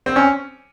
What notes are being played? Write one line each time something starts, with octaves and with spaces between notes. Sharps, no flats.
C4
C#4